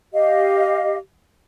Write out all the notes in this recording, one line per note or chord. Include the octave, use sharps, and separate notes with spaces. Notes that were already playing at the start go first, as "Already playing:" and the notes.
G4 D#5 F5